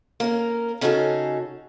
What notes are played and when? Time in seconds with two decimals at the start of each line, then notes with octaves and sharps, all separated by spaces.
0.20 A#3 C#4 A#4
0.81 C#3 C#4 D#4 F#4 G#4 A4